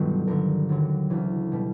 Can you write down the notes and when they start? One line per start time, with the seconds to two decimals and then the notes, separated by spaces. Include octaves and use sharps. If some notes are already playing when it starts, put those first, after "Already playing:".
Already playing: G1 G2 B2 D#3 F#3
0.27 G1 G2 D3 A#4
0.69 D#2 D3 F#3
1.10 D2 C#3 E3
1.52 B2 G3